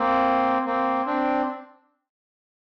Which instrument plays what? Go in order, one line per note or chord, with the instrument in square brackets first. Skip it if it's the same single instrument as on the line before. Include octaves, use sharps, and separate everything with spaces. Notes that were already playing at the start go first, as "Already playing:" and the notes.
Already playing: [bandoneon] A#3 C4
A#3 C4
C4 D4